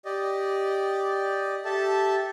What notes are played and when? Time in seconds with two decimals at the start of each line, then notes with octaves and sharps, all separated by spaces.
0.05 G4 D5 D#5
1.65 G4 A4 E5 A5